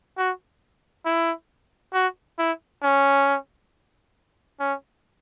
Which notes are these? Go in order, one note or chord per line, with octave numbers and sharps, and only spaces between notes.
F#4
E4
F#4
E4
C#4
C#4